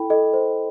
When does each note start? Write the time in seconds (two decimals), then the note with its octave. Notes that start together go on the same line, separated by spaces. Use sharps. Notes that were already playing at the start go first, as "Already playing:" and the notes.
Already playing: E4 A4 G5 B5
0.10 A4 D#5
0.34 C5